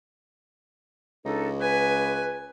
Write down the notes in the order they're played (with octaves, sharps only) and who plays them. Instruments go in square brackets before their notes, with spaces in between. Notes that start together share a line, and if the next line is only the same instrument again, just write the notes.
[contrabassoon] C#2 [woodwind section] D4 D#4 A4
[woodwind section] B4 [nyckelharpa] G#5